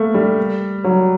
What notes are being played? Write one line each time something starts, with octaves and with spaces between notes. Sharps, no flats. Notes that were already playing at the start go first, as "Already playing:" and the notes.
Already playing: A3 A#3
G3
F#3